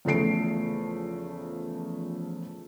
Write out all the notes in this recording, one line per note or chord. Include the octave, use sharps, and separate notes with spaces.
E2 C#3 F3 A3 C7 D7